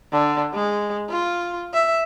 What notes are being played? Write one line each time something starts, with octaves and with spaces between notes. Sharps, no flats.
D3
G#3
F4
E5